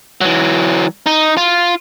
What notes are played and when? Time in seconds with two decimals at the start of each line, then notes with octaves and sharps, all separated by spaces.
0.21 E3 F#3
1.06 D#4
1.37 F4